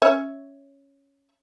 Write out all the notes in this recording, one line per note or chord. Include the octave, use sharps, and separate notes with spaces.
C#4 C#5 E5